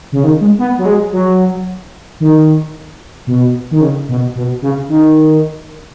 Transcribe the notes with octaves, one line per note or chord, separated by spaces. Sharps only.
C#3
D#3
G#3
B3
F#3
G#3
F#3
D#3
B2
D#3
C#3
B2
B2
C#3
D#3